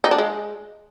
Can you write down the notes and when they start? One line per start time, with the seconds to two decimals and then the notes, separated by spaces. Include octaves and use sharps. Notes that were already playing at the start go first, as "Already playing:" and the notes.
0.04 D#4
0.11 D4
0.18 G#3